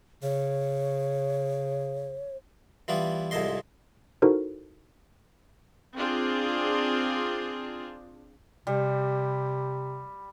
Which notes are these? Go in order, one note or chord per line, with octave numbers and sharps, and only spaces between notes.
C#3 C#5
E3 G3 B3 F4
C2 F2 G#2 C5 D#5 C6
D#4 E4 F#4 A4 A#4 C5
C4 D4 F4 G#4
C3 G3